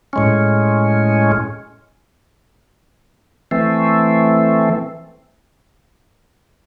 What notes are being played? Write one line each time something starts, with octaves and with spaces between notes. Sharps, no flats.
A2 G#3 C#4
E3 A3 C4